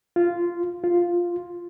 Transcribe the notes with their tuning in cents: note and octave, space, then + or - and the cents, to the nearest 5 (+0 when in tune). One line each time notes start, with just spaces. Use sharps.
F4 -10
F4 +0